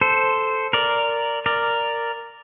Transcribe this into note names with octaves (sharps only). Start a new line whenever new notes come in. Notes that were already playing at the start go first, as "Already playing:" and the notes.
A4 C5
A#4 D5
A#4 D5